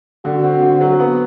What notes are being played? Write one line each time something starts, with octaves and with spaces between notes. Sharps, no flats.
D3 F#4
C4
D3
F#3
B3